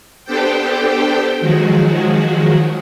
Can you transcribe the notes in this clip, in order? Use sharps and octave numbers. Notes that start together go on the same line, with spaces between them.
B3 D4 G4 A4 C5 G5
D#3 F3 F#3 G#3 F#4